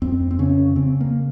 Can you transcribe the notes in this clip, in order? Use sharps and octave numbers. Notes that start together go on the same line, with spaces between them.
F2 C4
C4
C#3 C#4
C#3 C4
A#3